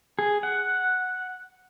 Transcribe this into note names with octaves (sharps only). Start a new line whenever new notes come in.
G#4
F#5